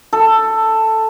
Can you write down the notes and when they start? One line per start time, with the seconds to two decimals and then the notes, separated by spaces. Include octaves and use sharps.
0.13 A4